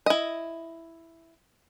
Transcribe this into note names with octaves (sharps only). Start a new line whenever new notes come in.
E4 D#5